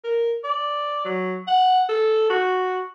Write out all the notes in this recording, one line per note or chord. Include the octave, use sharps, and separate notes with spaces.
A#4
D5
F#3
F#5
A4
F#4